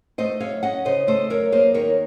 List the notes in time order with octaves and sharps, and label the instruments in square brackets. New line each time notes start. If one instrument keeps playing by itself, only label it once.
[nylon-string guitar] A3 C5 D#5
F#2 C#5 F5
C#4 D#5 F#5
C#3 C5 D#5
A3 C5 D#5
F#2 A#4 C#5
A#3 C5 D#5
D#2 A#4 C#5